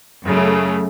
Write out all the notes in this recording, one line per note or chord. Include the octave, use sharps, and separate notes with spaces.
F#2 C#3 A3